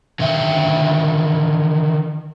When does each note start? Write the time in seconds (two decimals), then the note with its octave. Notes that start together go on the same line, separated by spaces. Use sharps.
0.19 D3 D#3 E5 G5